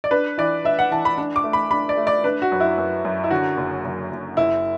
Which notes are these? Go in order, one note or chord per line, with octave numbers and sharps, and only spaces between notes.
D5
D4 B4
E3 D5
D4 E5
F#5
E3 A5
B5
D4
D6
A3
B5
D4 B5
D5
A3
D5
D4 B4
F#4
F#2
E4
F#2
F#2
E4
D3 F#4
F#1
F#1
F#1
F#1 E4